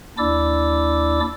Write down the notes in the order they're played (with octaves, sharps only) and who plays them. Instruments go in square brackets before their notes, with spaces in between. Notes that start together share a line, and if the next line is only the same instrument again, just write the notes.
[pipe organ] D#2 D4 E4 D5 D6 E6